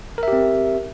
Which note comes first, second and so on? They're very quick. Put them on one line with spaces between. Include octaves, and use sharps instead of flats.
A#4 E5 G4 C4